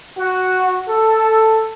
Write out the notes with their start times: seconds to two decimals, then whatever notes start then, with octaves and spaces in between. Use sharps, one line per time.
0.18 F#4
0.87 A4